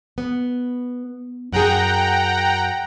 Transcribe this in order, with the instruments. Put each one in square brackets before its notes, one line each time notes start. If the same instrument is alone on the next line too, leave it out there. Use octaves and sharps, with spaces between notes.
[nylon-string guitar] B3
[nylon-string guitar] F#2 G#4 [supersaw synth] F#5 G5 A#5